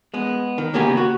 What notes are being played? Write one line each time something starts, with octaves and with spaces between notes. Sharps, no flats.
G#3 B3
D#3
C#3 A#3 B3 G4 G#5
F#4